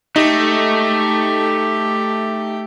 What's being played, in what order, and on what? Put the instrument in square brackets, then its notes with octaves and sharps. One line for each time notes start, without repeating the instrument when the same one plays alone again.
[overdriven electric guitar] A3 [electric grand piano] D#4 [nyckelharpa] G4